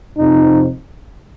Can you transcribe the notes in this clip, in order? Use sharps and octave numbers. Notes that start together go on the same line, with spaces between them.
F2 C3 F3 C4 D#4